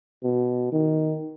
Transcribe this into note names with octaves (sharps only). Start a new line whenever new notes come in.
B2
D#3